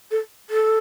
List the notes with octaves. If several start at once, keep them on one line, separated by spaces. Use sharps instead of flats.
A4
A4